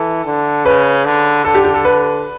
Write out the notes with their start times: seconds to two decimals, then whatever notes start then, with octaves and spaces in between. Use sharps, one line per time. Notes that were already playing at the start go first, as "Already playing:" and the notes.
Already playing: E3 A4
0.26 D3
0.65 C#3 B4
1.05 D3
1.45 D3 A4
1.55 G4
1.65 G4
1.74 A4
1.85 B4